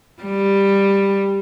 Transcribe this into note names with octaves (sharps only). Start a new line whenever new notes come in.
G3